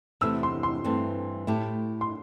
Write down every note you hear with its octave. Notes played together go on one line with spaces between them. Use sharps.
E2 C3 A3 E4 E6
C6
C6
G2 E3 A3 C4
A2 A3 E4 G4
C6